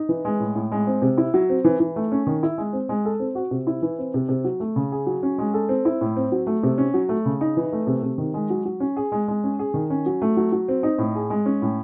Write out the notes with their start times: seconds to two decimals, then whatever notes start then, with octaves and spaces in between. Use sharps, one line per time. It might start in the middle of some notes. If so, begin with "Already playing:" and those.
Already playing: D#4
0.09 E3
0.25 G#3
0.40 A2
0.55 A2
0.72 G#3
0.87 C4
1.02 C3
1.18 E4
1.34 F#3
1.49 C4
1.64 E3
1.80 E3
1.96 A3
2.12 C#4
2.27 D#3
2.43 E4
2.58 G#3
2.73 C4
2.89 G#3
3.05 A4
3.20 C4
3.35 F#4
3.51 C3
3.67 E4
3.82 E3
3.98 C4
4.14 C3
4.29 C3
4.44 F#3
4.60 A3
4.76 C#3
4.92 G#4
5.06 F#3
5.23 C#4
5.38 G#3
5.54 A4
5.69 C4
5.85 E4
6.01 A2
6.16 C4
6.32 F#3
6.47 A3
6.63 C3
6.78 C#4
6.94 F#3
7.09 A3
7.26 C#3
7.41 D#4
7.57 E3
7.72 A3
7.87 C3
8.03 C3
8.18 D#3
8.34 G#3
8.50 F#3
8.65 F#3
8.80 C#4
8.96 G#4
9.12 G#3
9.28 G#3
9.44 C#4
9.59 G#4
9.74 D#3
9.90 C#4
10.06 F#3
10.22 A3
10.37 F#3
10.52 F#3
10.68 C4
10.83 D#4
10.98 A2
11.15 G#4
11.30 G#3
11.46 C#4
11.62 A2